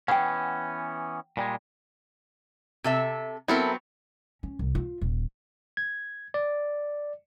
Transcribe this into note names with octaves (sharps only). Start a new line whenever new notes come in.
E3 B3 C#4 F#5 G5
A#2 G3 G#3
C3 A4 E5
F#3 B3 C4 E4 A4 A#4
C#4
C2
F4
D#1
G#6
D5